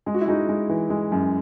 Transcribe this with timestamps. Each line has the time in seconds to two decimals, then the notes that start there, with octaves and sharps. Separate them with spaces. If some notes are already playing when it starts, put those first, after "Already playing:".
0.06 G#3 G#4
0.14 F#4
0.21 E4
0.28 G#3 D#4 F#4
0.49 G#3
0.69 E3
0.90 G#3
1.12 F#2